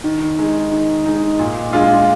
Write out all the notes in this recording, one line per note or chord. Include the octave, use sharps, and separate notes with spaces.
D#3
G#3 D#4
D#3
G#3 D#4
A#2
G#3 D4 F4